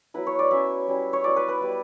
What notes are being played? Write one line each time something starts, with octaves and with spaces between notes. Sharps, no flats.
F#3 B3 E4 B4
C#5
D5
F#3 C#4 E4 E5
G3 C#4 E4
C#5
F#3 B3 E4 D5
B4
B4
G3 B3 E4